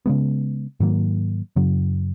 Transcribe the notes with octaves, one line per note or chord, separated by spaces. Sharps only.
C#3 G#3 B3
G#2 D#3 F#3 A#3
F#2 C#3 F#3